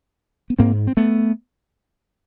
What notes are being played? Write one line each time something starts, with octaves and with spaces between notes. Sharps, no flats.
B3
G#2 A#3 C4
C4
A3 B3